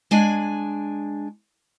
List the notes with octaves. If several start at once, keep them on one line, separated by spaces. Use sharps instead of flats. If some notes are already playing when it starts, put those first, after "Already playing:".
G#3 D4 G#5